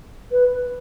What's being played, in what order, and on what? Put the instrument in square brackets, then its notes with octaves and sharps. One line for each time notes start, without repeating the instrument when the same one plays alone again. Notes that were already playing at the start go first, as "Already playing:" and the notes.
[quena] B4